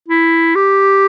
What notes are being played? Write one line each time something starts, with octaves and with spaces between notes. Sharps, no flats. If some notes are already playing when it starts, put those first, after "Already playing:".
E4
G4